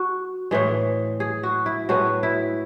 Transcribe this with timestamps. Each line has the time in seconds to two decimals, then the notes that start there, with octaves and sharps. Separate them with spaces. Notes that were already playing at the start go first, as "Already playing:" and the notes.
Already playing: F#4
0.51 A2 E3 G#3
1.20 G#4
1.43 F#4
1.66 E4
1.89 A2 G#3 B3 F#4
2.23 E4